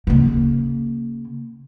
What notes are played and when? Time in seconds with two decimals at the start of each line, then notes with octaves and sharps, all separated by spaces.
0.07 C#3 A#3